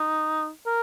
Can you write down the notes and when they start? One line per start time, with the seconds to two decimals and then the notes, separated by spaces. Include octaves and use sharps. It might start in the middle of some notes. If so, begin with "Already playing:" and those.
Already playing: D#4
0.66 A#4